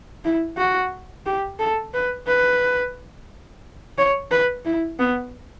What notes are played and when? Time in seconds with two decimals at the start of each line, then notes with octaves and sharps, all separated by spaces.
0.25 E4
0.58 F#4
1.26 G4
1.59 A4
1.94 B4
2.27 B4
3.98 C#5
4.31 B4
4.65 E4
4.99 B3